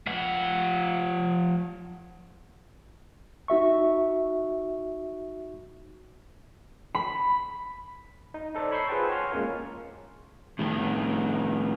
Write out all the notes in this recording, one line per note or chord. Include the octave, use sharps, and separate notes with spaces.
F3 F#5
D#4 F#4 E5 C#6
B5
D#4
D#4 A4 C5 D5
C#5 B5 C#6 E6 G6 C7
F4 G#4 B4 C5 G5 A5
C#5 F#5 G#5 C6 C#6 F6
G#3 A#3 C#4 F4 A#4
A2 D#3